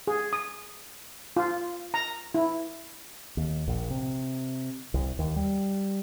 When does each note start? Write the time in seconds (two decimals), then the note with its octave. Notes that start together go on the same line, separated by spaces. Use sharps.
0.07 G#4
0.33 D#6
1.37 F4
1.94 A#5
2.34 E4
3.37 D#2
3.68 A#1
3.90 C3
4.94 C2
5.19 D#2
5.36 G3